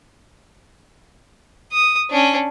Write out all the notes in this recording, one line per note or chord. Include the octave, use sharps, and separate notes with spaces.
D#6
C#4 D4